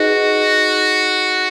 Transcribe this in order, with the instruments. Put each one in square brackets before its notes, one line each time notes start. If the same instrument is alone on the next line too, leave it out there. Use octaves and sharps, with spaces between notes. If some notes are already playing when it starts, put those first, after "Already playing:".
Already playing: [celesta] D#4 G#4 B4 D#5 [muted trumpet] F#4